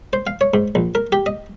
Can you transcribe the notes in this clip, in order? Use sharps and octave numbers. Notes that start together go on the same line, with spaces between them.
C5
F5
C#5
G#2
A#1
A#4
G4
D#5